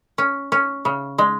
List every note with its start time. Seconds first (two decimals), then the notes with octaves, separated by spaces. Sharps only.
0.18 C#4
0.52 C#4
0.85 C#3
1.18 G#3